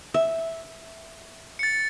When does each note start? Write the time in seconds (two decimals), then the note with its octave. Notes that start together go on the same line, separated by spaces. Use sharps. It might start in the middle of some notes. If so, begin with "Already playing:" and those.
0.14 E5
1.59 A6 C#7